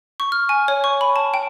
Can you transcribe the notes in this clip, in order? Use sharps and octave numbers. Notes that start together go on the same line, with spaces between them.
C#6
F6
G#5
C#5
C#6
B5
A5
G5